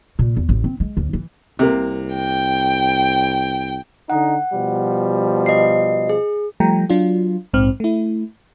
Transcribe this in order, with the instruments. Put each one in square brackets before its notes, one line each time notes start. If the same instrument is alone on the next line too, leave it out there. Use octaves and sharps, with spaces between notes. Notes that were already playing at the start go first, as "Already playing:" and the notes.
[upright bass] A#2
E2
A1
C4
G#3
D2
E3
[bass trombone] C2 [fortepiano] C3 A#3
[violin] G5
[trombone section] D3 D#4 [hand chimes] F#5
[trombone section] B2 F3 G3
[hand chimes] D#5 C7
G#4
[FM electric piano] F3 G3 A3 G5 A#5
F#3 D4 F4
A#1 G#2 C4 F6
A3 E4